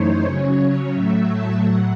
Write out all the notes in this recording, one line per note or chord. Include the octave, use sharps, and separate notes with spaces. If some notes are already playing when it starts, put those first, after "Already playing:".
Already playing: F#2 E3 A3 D#4 C5 C#5
C#3 F#3 C#4 C#5
C#5
A2 F#3 A3 E5
A5
A2 F#3 F#5